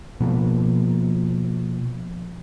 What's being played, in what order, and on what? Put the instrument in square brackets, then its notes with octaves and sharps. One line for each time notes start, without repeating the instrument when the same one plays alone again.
[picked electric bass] B2 F3 A#3